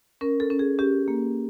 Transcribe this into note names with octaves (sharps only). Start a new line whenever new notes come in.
C#4 A#4
A4
C#4
G#4
C#4 G4
A#3